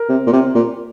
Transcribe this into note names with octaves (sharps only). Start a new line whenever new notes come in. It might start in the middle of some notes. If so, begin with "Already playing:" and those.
Already playing: A#4
C3
A#2
C3
A#2